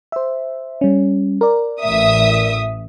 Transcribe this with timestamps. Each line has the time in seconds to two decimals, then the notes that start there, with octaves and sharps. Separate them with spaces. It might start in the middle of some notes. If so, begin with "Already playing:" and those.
0.12 C5 E5
0.81 G3 C#4
1.41 A#4 D5
1.82 A1 E5 D#6